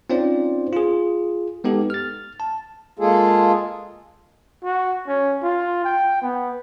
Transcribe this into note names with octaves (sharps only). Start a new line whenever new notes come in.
C4 C#4 D#4 F4 C5 D5
F4 G#4
G#3 B3 D#4 G4 A4
F6 A6
A5
G#3 A#3 F4 G#4 A4
F#4
C#4
F4
G5
B3